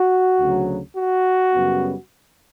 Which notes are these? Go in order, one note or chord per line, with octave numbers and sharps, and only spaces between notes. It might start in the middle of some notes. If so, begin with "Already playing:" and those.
Already playing: F#4
D2 C#3 F#3
F#4
F#2 C#3 G3 B3